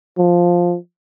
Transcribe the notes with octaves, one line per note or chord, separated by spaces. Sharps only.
F3